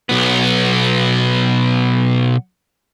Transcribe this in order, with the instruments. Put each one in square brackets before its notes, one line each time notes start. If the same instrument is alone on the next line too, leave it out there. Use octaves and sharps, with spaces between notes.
[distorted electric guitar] B1 B3